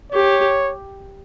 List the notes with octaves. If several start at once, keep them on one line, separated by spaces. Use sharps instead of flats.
G4 C#5